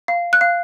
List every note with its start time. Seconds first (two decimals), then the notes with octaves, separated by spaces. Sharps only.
0.08 F5
0.33 F#6
0.41 F5